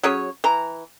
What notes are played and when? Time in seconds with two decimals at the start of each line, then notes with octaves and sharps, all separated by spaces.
0.03 F#3 C#4 G#4 C#5
0.44 E3 A#5